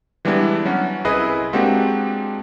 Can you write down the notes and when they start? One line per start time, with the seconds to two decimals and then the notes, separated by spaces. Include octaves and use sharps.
0.25 E3 G3 G#3 B3 D4 E4
0.65 F#3 C#4 F#4
1.05 C2 E4 G#4 B4 D#5
1.53 G#3 A#3 C4 D4 F#4 G4